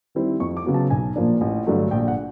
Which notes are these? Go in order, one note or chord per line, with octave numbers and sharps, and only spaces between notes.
D#3 G3 C4 E4
F2 C#6
D6
C#3 F#3 B3
A5
B1 G#5
A#2 F3 A#3 D4
A1
G2 D3 F#3 A3
A#1 G5
F#5